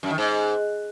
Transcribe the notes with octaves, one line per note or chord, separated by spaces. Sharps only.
F#2
D#3
G#2